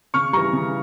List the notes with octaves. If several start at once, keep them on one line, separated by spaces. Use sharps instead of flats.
C#3 C#6 F6
E3 G3 A#5 C#6
C#3